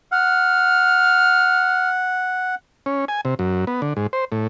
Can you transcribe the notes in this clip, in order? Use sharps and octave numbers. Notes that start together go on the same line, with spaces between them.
F#5 F6
C#4
G#5
C3
F#2
B3
D3
G#2
C5
A2